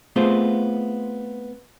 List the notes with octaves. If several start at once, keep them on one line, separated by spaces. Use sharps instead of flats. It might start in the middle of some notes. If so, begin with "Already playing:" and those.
A3 B3 C4 F4 G#4 C5